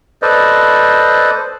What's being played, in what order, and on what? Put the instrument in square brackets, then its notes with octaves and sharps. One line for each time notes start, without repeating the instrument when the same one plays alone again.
[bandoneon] A4 B4 C5 D5 D#5